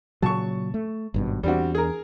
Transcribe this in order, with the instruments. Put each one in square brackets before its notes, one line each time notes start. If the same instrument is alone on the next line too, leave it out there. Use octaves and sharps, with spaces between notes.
[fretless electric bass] A#2 C#3 F#3 [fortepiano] A5 C#6
[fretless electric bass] A3
G#1 G2 B2
[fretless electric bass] E2 D4 [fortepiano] G3 C4 F#4
[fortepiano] G#4 A#4